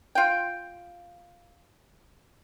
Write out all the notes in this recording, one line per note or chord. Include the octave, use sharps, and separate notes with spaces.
F4 G5